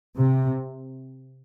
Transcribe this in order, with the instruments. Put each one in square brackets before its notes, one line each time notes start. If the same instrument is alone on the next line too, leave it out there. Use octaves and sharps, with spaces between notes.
[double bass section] C3